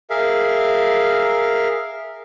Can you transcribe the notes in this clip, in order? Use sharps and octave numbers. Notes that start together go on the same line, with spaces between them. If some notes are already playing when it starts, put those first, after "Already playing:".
G#4 A#4 E5 F5